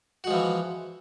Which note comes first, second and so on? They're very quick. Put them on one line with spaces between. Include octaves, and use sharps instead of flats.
F#4 G#3 F3 E3